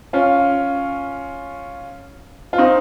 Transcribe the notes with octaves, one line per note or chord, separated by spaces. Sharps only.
C#4 F4
F4
C4 D#4